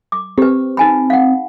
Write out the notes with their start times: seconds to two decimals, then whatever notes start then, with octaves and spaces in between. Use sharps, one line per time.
0.12 D6
0.38 C4 G4 B4
0.77 D#4 G#5 B5
1.10 F5 F#5